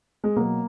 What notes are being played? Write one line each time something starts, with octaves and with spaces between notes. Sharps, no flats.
G#3
B2 F#3 A#3